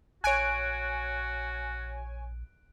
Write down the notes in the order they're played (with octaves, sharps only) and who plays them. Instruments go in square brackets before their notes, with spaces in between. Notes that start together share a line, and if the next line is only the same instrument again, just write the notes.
[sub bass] A#1 [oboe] F#4 [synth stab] C#5 G#5 [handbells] F#6 D7